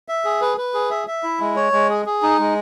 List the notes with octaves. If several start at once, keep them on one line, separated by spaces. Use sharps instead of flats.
E5
G#4
B4
B4
G#4
E5
E5
E4
G#3
C#5
G#3
G#4
G#4
D#4
G#3